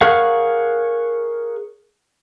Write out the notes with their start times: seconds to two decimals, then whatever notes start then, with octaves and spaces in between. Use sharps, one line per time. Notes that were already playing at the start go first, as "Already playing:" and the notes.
0.01 G#4 A#4 C#5 F5 F#5